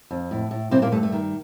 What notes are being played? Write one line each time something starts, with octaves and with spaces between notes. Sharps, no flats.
F2
A2
A2
G2 C3 C4
A#2 A#3
G2 A3
A3
D#3